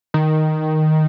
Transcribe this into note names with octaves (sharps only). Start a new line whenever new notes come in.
D#3